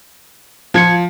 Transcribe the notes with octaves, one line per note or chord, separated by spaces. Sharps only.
F3 F4 G#6 C#7